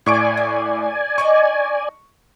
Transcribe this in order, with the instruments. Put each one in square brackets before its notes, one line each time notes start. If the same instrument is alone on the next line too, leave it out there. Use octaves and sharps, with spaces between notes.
[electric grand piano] A2 C#6 D7 [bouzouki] F4 [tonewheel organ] D5 G#5
[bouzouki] A#3
[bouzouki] D4 D#4 D#5 [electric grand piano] C#6